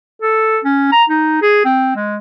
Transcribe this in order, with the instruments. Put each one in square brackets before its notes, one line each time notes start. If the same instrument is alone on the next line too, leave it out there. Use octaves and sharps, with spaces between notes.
[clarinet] A4
C#4
A#5
D#4
G#4
C4
G#3